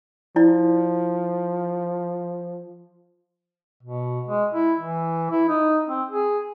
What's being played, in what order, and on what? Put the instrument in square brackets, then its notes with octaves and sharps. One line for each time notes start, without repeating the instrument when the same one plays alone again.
[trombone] F3 [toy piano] E4 D5
[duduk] B2
G#3
E4
E3
E4
D#4
C4
G#4